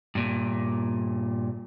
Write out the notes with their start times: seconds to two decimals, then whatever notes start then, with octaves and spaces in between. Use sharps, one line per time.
0.15 G2 A#2